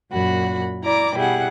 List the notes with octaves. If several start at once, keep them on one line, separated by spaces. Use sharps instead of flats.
F#2 A#2 F#4 B5
E4 D5 A#5 D6
B2 G3 E4 G#4 F#5